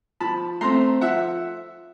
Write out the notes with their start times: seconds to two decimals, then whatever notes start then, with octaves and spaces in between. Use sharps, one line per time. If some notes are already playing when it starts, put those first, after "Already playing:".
0.20 F3 A5 B5
0.61 A3 C4 A#5 C6
1.01 F3 E5 F#5